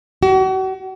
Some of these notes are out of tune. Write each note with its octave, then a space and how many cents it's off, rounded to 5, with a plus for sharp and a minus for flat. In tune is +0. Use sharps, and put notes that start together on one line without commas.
F#4 +40